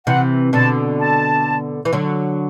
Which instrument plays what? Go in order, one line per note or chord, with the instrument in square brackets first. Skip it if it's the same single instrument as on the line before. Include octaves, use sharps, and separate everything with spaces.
[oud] C3 E3 [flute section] F#5
[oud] B2 D3 [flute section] A5
[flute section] A5
[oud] E3
D3 F#3